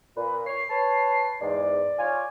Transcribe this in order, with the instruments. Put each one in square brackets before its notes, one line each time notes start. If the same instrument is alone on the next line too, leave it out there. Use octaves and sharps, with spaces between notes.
[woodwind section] A#2 [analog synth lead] B4
[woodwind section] C#5 [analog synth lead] C7
[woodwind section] B4 C#5 A5
[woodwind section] E2 G#2 [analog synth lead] D5
[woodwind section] F4 C#5 G#5